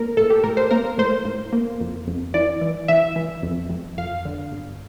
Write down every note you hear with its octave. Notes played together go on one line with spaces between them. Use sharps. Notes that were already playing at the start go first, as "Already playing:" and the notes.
Already playing: A#3 A#4
A2 A4
G4
A2 A#4
C5
A#3 A#4
A2 C5
A2
A#3
F2
F2
E3 D5
E3
E3 E5
E3
F2
F2
F2 F5
D3
G1